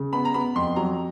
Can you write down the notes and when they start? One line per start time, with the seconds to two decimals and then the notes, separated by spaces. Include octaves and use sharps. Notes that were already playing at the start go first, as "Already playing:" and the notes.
Already playing: C#3
0.13 B3 B5
0.25 A#5
0.34 B3 B5
0.56 F2 C6
0.76 F#3 A#5